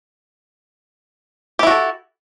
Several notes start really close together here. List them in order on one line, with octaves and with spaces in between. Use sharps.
G4 E4 F#4 A4